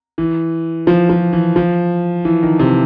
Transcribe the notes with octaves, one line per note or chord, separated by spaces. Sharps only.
E3
F3
F3
E3
F3
E3
D#3
C3